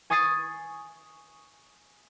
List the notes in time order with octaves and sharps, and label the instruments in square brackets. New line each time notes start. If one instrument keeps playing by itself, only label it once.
[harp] G#5 C#6 D#6 A6 C7 D#7